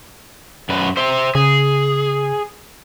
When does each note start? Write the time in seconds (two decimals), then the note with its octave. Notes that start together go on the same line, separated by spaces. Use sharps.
0.69 F#2 B4
0.97 C5 E5
1.35 C#3 G#4